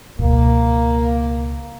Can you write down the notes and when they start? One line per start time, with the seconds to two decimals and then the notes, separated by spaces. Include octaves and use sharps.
0.19 C#2 B2 A#3